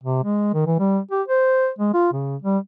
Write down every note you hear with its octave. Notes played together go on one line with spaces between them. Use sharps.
C3
G#3
D#3
E3
G3
G4
C5
G#3
F4
C#3
G3